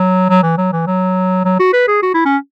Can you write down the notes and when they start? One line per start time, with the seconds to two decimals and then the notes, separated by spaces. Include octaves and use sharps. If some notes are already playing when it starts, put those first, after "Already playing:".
Already playing: F#3
0.30 F#3
0.43 E3
0.58 F#3
0.72 E3
0.87 F#3
1.45 F#3
1.60 F#4
1.73 B4
1.88 G#4
2.03 F#4
2.14 E4
2.26 C#4